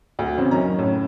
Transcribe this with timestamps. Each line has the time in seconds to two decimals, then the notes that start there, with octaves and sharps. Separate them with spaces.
0.19 D2
0.38 A1 C#3 C4
0.51 F#2 D#3 C#4 A#5
0.79 A2 C#3